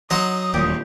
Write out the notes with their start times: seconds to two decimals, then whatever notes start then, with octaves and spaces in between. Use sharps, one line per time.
0.10 F#3 D#4 F#5 C6 D#6
0.54 D#1 D2 A#2 G4